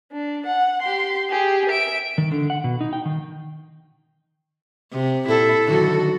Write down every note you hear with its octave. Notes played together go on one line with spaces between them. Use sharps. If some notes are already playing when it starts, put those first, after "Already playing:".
D4
F#5
G4 C6
G4 G#4
E5 D7
D#3
D3
F#5
B2
D#4
G5
D#3
C3
A#2 E4 A4
D3 D#3 F#3 F#4